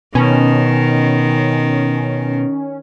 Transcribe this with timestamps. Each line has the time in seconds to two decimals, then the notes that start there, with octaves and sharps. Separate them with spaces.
0.15 B2 D#3 C#4